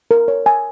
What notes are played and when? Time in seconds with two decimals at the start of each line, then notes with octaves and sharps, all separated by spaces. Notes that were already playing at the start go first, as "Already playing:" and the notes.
0.11 A#4
0.28 C#5
0.46 G#5